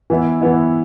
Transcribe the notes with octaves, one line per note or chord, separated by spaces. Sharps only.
E3 B3 E4
E3 B3 E4